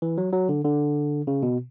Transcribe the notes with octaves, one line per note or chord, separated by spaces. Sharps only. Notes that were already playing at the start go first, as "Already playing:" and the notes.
E3
F#3
F#3
D3
D3
C#3
B2